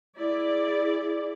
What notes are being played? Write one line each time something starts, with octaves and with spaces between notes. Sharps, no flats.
E4 G#4 D5